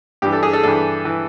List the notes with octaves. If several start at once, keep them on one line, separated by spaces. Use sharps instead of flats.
G2 E3 G4
A4
G#4
A4
G2 E3 A4
E3